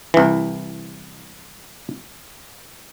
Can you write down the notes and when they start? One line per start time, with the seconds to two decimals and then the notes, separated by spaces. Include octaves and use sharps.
0.14 C2 E3